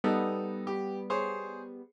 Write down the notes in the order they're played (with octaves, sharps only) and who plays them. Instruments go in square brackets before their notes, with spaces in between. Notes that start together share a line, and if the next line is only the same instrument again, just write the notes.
[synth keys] G3 B3 [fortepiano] D#4 A4
[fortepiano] G4
G#4 C5 C#5